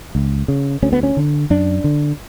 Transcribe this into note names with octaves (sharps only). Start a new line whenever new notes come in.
C#2
C#3
D2 C#4
B3
C#4
D3
F#2 D4
D3